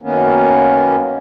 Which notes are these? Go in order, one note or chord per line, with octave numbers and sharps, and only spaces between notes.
F#2 D#3 A#3 B3 C#4